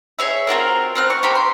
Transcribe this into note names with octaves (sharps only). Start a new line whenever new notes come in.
G#4 C#5 E5
C4 F4 F#4 A#4
C4 F6 F#6
C#6
A#3 G4 A#4 C5
C6